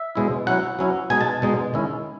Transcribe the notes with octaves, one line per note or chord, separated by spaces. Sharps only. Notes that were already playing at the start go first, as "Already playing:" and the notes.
Already playing: E5
B2 G#3 C#4 E4
F#3 C#4 E4 F#5
F#3 C#4 E4
B2 G#3 D#4 G#5
A5
B2 G#3 D#4
D#3 G#3 C#4 E4